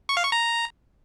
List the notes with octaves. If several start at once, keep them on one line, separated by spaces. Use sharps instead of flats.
C#6
F5
C#6
A#5